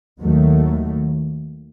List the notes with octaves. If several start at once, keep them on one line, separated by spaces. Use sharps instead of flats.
D#2 D#3 F#3 A3